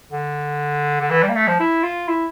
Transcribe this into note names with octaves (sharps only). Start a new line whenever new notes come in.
D3
D3
E3
G3
A#3
A3
F3
E4
F4
E4